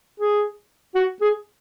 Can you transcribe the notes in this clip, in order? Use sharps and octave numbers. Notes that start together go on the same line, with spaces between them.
G#4
F#4
G#4